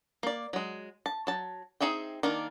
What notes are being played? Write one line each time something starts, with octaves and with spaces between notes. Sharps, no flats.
A#3 D5
F#3 G#3
A5
F#3 A5
C4 D#4 G#4 E5 G5
D#3 A#3 D4